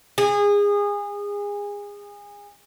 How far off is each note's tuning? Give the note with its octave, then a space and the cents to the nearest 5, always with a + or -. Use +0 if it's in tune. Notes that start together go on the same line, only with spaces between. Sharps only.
G#4 -25